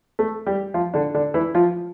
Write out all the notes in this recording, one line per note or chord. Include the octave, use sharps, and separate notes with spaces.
A3 A4
G3 G4
F3 F4
D3 D4
D3 D4
E3 E4
F3 F4